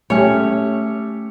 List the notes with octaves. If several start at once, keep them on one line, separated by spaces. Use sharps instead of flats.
A3 C#4 G4 C#5